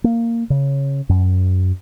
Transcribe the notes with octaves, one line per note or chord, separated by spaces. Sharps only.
A#3
C#3
F#2